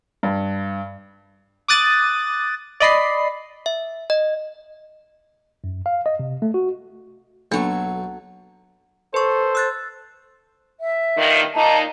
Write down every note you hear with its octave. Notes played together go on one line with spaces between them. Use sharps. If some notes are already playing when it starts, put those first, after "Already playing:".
G2
D6 D#6 F#6 A6 D#7
D5 D#5 B5 C7
E5
D#5
F#2
F5
D#5
C3
A3
F#4
B1 F#3 A#3 B3 D4 A4 C#6
A4 B4 C5 C#6
E6 F#6 A6
E5
G2 A#2 D#3
A#2 D#4 A5 A#5